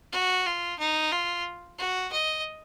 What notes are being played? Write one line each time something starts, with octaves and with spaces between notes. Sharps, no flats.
F#4
F4
D#4
F4
F#4
D#5